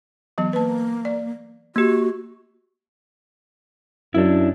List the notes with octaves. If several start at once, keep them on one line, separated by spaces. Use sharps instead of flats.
E3 F#3 B3
A#3 B4 A5
D5
A#3 F#4 G4
F#2 D4 E4